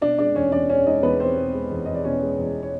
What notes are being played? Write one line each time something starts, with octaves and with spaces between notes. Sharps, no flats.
B2 D4 D5
G#3 D4 D5
E2 C#4 C#5
E2 D4 D5
B2 C#4 C#5
G#3 D#4 D#5
E2 B3 B4
E2 C4 C5
B2
G#3
E2
E2 D#5
D5
B2 C#4 C#5
G#3
E2
C#5